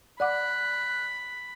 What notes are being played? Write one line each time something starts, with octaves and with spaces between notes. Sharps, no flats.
D5 F#5 B5 D6 F#6